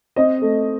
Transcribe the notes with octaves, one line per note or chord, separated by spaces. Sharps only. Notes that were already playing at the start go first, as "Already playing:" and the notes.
C4 D#5
A3